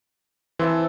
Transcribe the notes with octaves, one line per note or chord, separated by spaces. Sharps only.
E3 C4 E5 A5